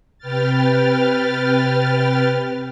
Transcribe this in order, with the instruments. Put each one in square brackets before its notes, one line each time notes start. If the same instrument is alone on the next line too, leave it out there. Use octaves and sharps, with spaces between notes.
[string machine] C3 B4 G5 F6 A6